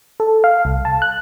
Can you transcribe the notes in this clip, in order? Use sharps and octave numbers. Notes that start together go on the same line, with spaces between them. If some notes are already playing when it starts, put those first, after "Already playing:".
A4
F5
C2
A5
F#6